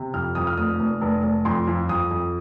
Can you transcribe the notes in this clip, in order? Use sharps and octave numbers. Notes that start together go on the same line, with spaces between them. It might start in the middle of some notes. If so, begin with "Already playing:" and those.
Already playing: C3
F2 F6
F2 D#6
F6
F1 D#6
F1
F1
F1
F2 C6
F2
F2 D#6
F2